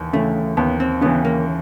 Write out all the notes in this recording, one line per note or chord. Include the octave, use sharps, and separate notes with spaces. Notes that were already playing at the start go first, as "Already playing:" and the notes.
Already playing: D#2 E3
C#3 E3 A3
D#2 B3
C4
C#3 E3 B3
A#3